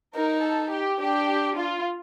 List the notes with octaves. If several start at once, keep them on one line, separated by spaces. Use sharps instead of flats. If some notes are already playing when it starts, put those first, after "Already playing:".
D#4 A#4
A4
G4
D4 G4
F4